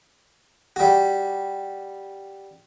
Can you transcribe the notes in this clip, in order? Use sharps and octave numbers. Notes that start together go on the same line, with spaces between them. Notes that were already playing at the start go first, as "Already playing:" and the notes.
G3 F#4